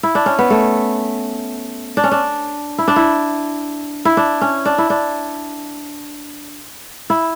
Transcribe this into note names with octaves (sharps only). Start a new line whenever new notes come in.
E4
D4
C#4
B3
A3
D4
C#4
D4
E4
D4
E4
E4
D4
C#4
D4
E4
D4
E4